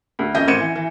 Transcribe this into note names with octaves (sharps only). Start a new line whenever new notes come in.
D2
F2 C#4 D#5 E5 G6 A#6
A1 C4 G#6 C#7 D#7 E7
E3
E3